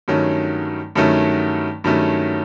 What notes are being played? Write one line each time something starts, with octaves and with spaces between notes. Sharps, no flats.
G2 D#3 F#3 A3 C#4
G2 D#3 F#3 A3 C#4
G2 D#3 F#3 A3 C#4